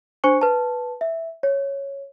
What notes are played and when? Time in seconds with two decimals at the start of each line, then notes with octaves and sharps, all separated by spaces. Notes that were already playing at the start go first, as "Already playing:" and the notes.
0.24 D4 C5 G#5 C#6 C#7
0.41 B4 A5
1.01 E5
1.43 C#5